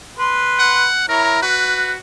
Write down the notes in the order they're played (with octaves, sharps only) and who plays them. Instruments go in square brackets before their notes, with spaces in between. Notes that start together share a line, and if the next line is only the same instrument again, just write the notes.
[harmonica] B4 C6
[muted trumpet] F#5
[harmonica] E4 C#5 A#5 [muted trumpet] A#4
[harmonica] F#4 [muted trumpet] B4